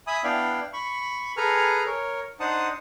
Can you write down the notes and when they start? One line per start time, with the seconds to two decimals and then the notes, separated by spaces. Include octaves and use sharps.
0.07 E5 G#5 B5 D#6
0.24 B3 D4 E4 D5 F5 G5
0.73 B5 C#6
1.37 G#4 A4 B4 G#5 A#5 F6
1.86 A#4 C#5
2.40 D4 D#4 C5 F#5 A5 D#6